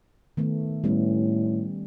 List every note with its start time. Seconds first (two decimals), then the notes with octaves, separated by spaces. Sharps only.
0.37 D#3 A3 B3
0.84 A2 G3 B3 C#4